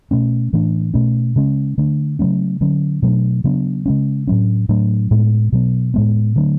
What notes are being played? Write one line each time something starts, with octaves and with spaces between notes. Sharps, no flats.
B2 A3 C#4
A2 E3 A3 D4
B2 A3 C#4
C#3 G#3 C#4
D3 A3 D4
C#3 F#3 A3 C#4
D3 F#3 C#4
B2 F#3 A3 D4
C#3 F#3 B3 D4
C#3 G#3 C#4
A2 F#3 C#4
A2 F#3 A3 D4
A2 G#3 B3
B2 F#3 B3
A2 G#3 B3
D3 F#3 A3 D4